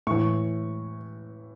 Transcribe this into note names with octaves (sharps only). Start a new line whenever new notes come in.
A2 E3 C#6